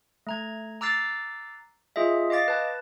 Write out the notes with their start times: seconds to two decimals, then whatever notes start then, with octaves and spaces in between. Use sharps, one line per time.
0.27 A3 A#5 G#6
0.81 A#5 D6 E6 F#6 A6 C7
1.96 F4 G#4 D#5 E5
2.30 D#5 F5 D6 A6 A#6
2.48 B4 A5